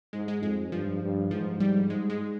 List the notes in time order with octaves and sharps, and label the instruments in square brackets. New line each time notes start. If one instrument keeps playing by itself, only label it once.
[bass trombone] G#2 [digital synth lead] G#3
[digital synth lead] G#3
[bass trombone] F2 [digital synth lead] G#3
[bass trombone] G2 [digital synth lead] F3
[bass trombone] G2
[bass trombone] G#2 [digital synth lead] F3
[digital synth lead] G3
[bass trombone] G#2 [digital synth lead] G#3
[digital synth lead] G#3